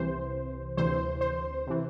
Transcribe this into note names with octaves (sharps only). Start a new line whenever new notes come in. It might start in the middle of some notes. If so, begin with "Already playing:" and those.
Already playing: C2 C3 E3 C5
D2 C3 E3 C5
C5
C3 E3